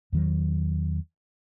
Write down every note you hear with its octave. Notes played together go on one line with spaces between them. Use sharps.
E2 D#3 F#3